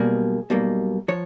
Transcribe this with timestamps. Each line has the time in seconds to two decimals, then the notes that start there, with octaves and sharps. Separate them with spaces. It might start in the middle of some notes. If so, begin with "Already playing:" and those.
Already playing: B1 B2 G3 A#3 G#4
0.50 B1 B2 G3 A#3
1.08 F3 C#5